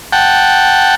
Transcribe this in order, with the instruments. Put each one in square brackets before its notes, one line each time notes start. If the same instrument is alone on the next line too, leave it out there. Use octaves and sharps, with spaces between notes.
[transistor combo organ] F#5 G5 A5